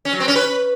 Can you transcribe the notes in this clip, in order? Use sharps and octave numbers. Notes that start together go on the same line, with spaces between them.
C#4
F#3
C4
C#4
B4